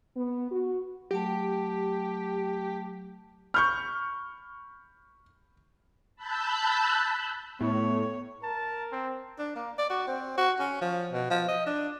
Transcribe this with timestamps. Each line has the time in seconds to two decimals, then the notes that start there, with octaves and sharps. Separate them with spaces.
0.17 B3
0.52 F#4
1.11 F#3 A3 G4 A5
3.54 B5 C#6 F6 G6
6.16 A5 B5 E6 F#6 G6
7.61 A2 B3 C#5
8.43 A#4 A5
8.92 C4
9.39 D4
9.55 A#3
9.78 D5
9.90 F#4
10.07 C4
10.37 F#4
10.59 C#4
10.81 F3
11.12 B2
11.30 F3
11.48 D#5
11.66 D4